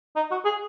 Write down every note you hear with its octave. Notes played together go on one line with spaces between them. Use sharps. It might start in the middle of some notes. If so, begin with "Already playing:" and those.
D#4
F#4
G#4